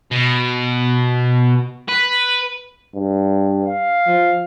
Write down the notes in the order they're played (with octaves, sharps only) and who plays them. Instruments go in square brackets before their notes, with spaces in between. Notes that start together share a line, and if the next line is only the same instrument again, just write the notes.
[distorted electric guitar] B2
B4
[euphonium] G2
[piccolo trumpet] F5
[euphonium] F3